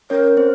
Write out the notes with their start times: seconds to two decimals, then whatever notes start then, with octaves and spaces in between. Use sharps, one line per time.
0.10 C#4 A#4 C#5
0.37 C4 C5